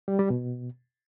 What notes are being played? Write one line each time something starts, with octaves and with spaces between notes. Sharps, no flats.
G3
G3
B2